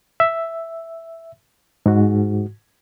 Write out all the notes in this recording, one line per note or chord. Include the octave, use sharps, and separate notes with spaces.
E5
G#2 F#4